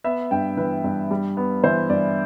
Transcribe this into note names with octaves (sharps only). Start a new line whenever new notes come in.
B3 E5
G2 G5
E3 B4
G2
G3
B3
E3 C5
G2 D5